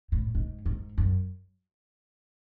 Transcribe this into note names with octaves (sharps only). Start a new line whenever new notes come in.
A2
G#2
G#2
F#2